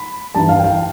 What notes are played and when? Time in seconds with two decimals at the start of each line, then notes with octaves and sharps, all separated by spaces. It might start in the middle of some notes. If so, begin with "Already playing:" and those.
Already playing: B5
0.35 G2 E3 A5
0.49 F5
0.59 G5
0.64 F5